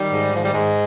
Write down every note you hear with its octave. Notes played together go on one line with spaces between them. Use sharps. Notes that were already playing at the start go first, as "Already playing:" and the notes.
Already playing: D#3 G3
G#2
D#3 F3
G3
G#2 G#3